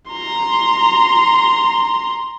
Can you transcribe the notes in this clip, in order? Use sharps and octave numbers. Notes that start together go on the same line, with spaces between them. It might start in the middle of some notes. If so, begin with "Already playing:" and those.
A#5 C6